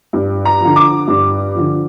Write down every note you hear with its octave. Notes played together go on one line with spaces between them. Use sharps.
G2
A#5
D3 F3
D6
G2
D3 F3